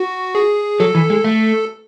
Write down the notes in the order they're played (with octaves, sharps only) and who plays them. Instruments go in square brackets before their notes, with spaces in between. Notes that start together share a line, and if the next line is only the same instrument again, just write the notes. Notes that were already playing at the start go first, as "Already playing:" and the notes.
Already playing: [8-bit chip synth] F#4
G#4
[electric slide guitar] F#3 [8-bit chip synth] A4
[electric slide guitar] E3
G#3
A3